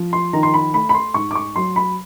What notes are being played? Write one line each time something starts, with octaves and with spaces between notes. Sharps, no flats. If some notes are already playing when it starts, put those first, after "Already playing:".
Already playing: F3
C6
D#3 A#5
C6
B5
A3 B5
B5
C6
G#2 C#6
D6
C#6
F#3 C6
B5